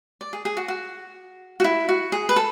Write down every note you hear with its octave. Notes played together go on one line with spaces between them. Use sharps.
D5
G#4
G#4
F#4
F#4
F#4
E4
F#4
G#4
B4
A4